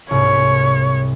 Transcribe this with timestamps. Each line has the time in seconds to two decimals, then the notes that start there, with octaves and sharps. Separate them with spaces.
0.11 C2 G#2 C#5